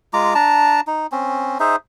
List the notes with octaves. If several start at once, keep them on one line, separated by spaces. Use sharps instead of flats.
G#3 F4 A#5 D6
D4 A5 A#5
D#4
C4 C#4
D#4 G#4 C5 E5